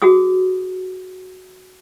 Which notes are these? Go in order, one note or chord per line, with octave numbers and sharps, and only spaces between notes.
F#4 G#4 D#6